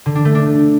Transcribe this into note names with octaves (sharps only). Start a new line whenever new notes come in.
D3
D4
A3
D4